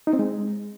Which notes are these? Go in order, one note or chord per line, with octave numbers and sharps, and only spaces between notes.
D#4
C4
G#3